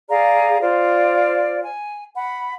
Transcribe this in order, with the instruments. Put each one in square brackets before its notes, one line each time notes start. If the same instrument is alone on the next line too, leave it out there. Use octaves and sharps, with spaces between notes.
[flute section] G#4 D5 F5 A#5
F4 C5 D5
G#5
F#5 B5